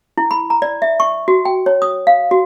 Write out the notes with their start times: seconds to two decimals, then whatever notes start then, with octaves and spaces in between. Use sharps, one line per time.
0.17 E4
0.31 B5
0.50 A#5
0.62 D5
0.82 E5
1.00 C#6
1.28 F#4
1.45 G5
1.66 C#5
1.82 D#6
2.07 F5
2.31 F#4